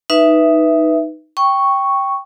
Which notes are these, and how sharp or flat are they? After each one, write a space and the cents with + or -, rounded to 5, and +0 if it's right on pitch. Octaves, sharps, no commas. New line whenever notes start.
D#4 +0 B4 +0 E5 +0
G5 +0 C#6 +0